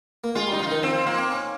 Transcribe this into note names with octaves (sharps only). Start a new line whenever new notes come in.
A#3
G#3 F4
G3 D#4
F3 F4
D#3 D#4
F3 C4
F3
F3 A#3
C4
C#4